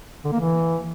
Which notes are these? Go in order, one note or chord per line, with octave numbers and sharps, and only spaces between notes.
D3
A#3
E3